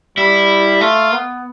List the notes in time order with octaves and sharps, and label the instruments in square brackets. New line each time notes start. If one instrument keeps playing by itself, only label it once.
[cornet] G3 [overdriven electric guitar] E4
[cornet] A3 [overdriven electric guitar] F4
[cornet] B3